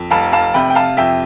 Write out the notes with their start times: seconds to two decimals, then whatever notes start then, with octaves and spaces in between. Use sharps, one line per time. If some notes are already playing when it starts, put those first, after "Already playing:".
Already playing: F2
0.10 F1 F5 A5
0.32 F5 A5
0.54 C3 G5 B5
0.70 G5
0.75 F5 A5
0.97 F2 E5 G5